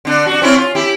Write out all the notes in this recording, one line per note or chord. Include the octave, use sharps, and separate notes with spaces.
D3 D4
D4 F#4
C4 C#4 E4
F4
E4 G4